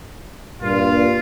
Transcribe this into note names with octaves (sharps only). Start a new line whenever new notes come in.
G2 A#2 F4